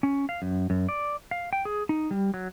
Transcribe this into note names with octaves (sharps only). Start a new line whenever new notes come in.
C#4
F5
F#2
F#2
D5
F5
G5
G#4
D#4
G3
F#3